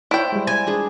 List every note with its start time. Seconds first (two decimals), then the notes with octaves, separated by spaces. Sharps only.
0.11 E4 C5 C#5 G5 A5 D6
0.32 G3 G#3
0.47 G#5
0.67 D4 G#4 B4